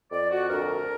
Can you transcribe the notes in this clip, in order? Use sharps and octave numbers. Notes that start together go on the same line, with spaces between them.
F2 D5
F#4
D2 A#4